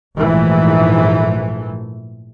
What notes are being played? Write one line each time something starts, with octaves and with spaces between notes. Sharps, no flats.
A#1 G#2 E3 A3